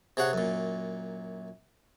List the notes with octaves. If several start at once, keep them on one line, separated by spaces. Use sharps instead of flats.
C3 G#4 C#5 F#5
F#2 A#2